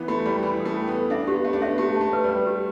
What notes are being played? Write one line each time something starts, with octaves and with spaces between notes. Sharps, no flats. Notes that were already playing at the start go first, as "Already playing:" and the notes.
Already playing: E3 B3
A3 B5
G3 B5
E3 B5
A4
A3
G5
B3
A4
D4 E5
B3 G4
A3 E5
D4
B3 E5
A3 G4
A5
A3
B4
G3
B4
G4